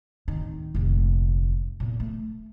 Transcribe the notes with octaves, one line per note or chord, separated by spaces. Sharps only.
D1 D#3
F1 A#1
E2 A#2
A3